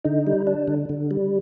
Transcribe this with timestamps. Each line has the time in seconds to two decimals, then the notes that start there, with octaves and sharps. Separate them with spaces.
0.05 D3 D#4
0.27 G3
0.47 D4
0.68 D3
0.89 D3
1.11 G3